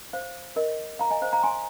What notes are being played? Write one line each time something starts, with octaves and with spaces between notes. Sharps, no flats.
C5 F5
A#4 D#5
F5 A#5
D#5 G#5
C5 F5
F5 A#5
G#5 C6